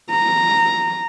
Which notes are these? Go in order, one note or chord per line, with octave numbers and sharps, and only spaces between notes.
A#5